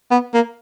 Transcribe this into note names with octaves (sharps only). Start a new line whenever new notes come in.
B3
A#3